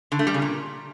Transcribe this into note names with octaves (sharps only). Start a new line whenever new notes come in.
D3
A3
G3
C#3
A#2